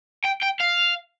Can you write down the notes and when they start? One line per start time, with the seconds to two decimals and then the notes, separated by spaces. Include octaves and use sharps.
0.24 G5
0.42 G5
0.60 F5